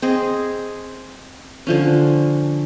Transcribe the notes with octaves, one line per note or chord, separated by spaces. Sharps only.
C4 G#4 D#5
D3 F3 C#4